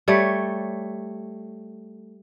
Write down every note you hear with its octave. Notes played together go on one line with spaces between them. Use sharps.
G3 A3 C#5